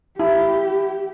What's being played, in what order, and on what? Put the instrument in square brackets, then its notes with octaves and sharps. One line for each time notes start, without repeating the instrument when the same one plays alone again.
[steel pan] E4 [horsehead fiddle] G4